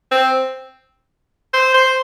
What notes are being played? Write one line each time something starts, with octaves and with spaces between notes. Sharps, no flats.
C4
C5
C5